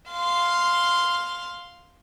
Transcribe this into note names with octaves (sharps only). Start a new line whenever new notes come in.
F5 C6